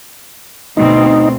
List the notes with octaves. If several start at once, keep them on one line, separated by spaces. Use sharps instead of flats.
D2 B2 C4 D#4